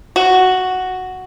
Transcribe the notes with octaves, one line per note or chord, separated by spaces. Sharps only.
F#4